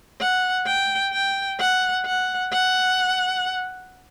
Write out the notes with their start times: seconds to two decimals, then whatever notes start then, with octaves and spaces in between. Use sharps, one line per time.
0.20 F#5
0.67 G5
1.13 G5
1.60 F#5
2.05 F#5
2.52 F#5